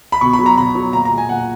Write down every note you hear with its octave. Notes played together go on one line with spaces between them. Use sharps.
B5
B2 C#6
B5
F#3
A#5
B2 B5
F#3
A#2 A#5
A#5
G#3
G#5
A#2 F#5